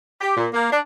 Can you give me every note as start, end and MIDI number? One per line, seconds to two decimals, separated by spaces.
0.21 0.33 67
0.36 0.47 46
0.54 0.69 58
0.70 0.79 62